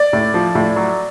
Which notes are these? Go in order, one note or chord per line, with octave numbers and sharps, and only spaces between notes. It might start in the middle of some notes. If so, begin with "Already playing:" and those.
Already playing: D5
A2
F3
A2
F#3